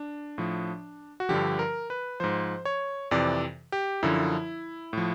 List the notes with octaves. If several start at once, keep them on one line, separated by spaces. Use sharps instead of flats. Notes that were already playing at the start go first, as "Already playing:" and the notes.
Already playing: D4
A2 F3
F#4
G2 D3 F3 G4
A#4
B4
G#2 F3 C5
C#5
F2 C3 E3 D5
G4
F#2 D3 F3 E4
A2 F3